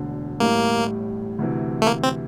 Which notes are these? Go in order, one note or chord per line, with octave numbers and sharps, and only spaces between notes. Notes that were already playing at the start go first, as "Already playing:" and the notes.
Already playing: E1 D2 D3
A1 A2 G3 A#3
D2 C3 E3
A3
A#3
C4